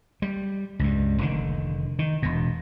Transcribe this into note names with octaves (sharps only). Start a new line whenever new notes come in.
G3
C#2 G2
F1 D3 D#3
D#3
E1 B2